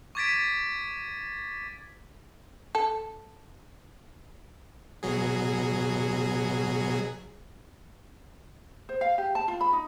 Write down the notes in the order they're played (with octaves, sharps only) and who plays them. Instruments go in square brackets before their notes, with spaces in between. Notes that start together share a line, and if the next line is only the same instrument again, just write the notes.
[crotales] C#6 D6 G#6 A6 B6 D7
[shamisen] A4
[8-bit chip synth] B2 F#3 G#4
[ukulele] C5
F5
G4
A5
F4
B5
D#4